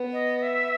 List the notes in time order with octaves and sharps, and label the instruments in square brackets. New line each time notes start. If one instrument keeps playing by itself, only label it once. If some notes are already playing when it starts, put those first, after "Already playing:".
Already playing: [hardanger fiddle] B3
[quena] D#5
E5